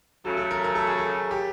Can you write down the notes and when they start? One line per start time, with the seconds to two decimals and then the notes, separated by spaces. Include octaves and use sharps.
0.25 C#3 F#3 A3 A4
0.37 A4
0.51 A#4
0.64 A#4
0.75 A4
0.87 G#4
0.98 A4
1.31 G4